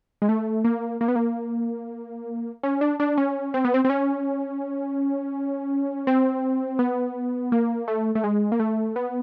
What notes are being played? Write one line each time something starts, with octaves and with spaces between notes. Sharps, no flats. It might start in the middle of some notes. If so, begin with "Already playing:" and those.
G#3
A3
A#3
A#3
B3
A#3
C#4
D4
D4
C#4
C4
B3
C4
C4
C#4
C4
B3
A#3
A3
A3
G#3
A#3
A3
B3